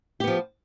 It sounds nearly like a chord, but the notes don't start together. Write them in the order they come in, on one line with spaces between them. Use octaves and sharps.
G4 B3 F3